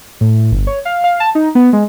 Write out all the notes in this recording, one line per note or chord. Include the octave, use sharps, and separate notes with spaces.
A2
G1
C#5
F5
F5
A5
D#4
B3
G#3